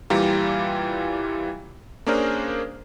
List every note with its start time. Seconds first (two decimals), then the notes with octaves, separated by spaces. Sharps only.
0.10 A#2 E3 G3 F4 G4 A#5
2.06 A#3 C#4 D4 G#4 A#4 C5